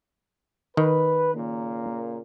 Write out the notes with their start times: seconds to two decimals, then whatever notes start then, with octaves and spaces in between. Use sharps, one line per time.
0.77 D#3 B4
1.34 A#2 C#3 A#3